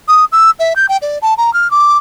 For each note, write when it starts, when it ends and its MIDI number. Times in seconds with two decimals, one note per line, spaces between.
0.08 0.25 87
0.32 0.51 88
0.60 0.74 76
0.76 0.86 91
0.89 0.97 79
1.02 1.18 74
1.22 1.34 81
1.38 1.53 82
1.53 1.70 89
1.71 1.98 86